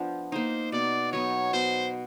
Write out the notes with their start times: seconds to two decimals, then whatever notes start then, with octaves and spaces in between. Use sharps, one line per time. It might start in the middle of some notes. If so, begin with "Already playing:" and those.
Already playing: F3 B3 D4
0.32 A#3 D#4 C5
0.72 B2 D5
1.13 F#3 B3 D#4 C#5
1.53 B2 C5